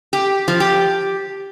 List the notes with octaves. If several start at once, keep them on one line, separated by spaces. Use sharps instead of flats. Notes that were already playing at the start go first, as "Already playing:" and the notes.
G4
F3
G4